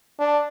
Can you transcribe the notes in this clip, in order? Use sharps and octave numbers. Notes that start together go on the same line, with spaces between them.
D4